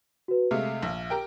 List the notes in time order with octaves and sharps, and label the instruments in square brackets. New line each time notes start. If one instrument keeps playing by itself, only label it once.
[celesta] F#4 B4
[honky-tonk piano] C3 G#3 A3 [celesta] E5 F5 F6
[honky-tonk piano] A#1
G4 A#4 G5